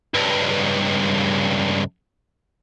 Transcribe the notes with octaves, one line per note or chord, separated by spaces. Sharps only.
C#2 G2